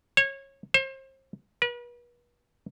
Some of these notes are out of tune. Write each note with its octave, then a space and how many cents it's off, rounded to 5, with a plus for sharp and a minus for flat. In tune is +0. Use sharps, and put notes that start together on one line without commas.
C#5 -25
C5 +35
B4 -40